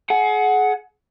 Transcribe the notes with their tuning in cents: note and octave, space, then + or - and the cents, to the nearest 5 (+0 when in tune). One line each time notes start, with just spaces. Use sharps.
G#4 +35 F#5 +0